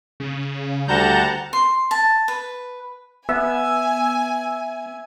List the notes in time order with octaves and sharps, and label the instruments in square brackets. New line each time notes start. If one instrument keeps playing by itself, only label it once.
[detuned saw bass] C#3
[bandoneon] D2 G3 G6 [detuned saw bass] D3 [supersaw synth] F#5 A5 A#5
[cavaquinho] C6
A5
B4
[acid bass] B3 [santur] E5 [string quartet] G#5